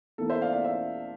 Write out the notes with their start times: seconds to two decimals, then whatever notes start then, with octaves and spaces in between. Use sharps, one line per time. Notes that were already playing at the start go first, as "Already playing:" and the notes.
0.18 E2 E3 A#3 A4
0.30 C5 E5
0.41 D5 F5
0.53 D5 F5
0.64 C5 E5